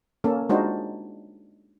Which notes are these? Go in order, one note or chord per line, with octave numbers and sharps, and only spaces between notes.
A#3 C#4 A4
G#3 D4 D#4 F4 F#4 C5